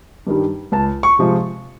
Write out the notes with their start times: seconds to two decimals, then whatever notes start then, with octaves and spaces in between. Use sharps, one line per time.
0.27 G2 D#3 G3
0.72 C#2 A5
1.03 C#6
1.19 C3 F3 G#3